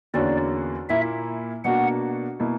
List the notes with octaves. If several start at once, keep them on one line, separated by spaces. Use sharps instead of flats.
E2 D3 A#3 C#4 F#4 D5
A#2 A#3 E4 E5
B2 A#3 D4 F#4 F#5
B2 A#3 E4